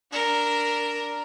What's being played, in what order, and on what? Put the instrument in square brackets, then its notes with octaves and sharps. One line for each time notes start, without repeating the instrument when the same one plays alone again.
[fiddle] D4 A#4